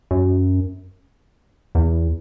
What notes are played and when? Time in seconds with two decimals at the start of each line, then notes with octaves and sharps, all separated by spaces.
0.11 F#2
1.75 E2